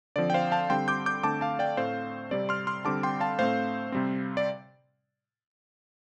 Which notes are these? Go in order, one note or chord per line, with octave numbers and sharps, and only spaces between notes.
D3 F3 C4 D5
G5
C5 F5
F5 A5
D3 G3 C4 G5 C6
D6 G6
D6 G6
D3 A3 C4 A5 D6
F5 A5
D5 G5
A2 A3 C4 C5 F5
C3 G3 C4 D5
C6 F6
C6 F6
D3 G3 C4 A5 D6
G5 C6
F5 A5
A2 A3 C4 C5 F5
C3 G3 C4
D5